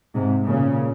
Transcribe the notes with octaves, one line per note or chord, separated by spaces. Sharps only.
G#2 C3
A#2 C#3